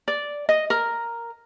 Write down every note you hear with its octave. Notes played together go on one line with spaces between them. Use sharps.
D5
D#5
A#4